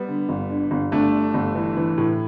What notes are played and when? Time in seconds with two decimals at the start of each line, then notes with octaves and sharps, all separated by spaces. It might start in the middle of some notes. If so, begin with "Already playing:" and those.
Already playing: G3 B3
0.08 D3
0.29 G1
0.50 D3
0.71 G1
0.92 G1 A3 D4
1.13 D3
1.34 G1
1.55 E3
1.77 E3
1.98 A2